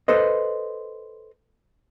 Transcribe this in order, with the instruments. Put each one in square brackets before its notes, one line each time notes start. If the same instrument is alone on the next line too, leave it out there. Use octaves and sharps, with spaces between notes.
[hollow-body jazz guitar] A4 B4 C5 D#5